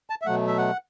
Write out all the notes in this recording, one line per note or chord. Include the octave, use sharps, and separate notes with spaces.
A5
E5
B2 F#3 A3 F#5
E5
F#5